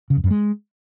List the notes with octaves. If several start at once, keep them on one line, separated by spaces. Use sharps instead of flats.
C#3
F2
F#2
G#3